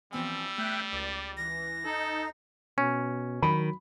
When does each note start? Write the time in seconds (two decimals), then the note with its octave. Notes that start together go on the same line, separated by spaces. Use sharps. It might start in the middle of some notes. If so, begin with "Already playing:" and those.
0.13 E3 F3 G3 B3 C4 G#5 E6
0.58 A3 E5 G5 F#6
0.93 C#2 D5
1.37 E3 A#6
1.85 D#4 A4
2.78 B2 C#4
3.42 D#3 F#3 B5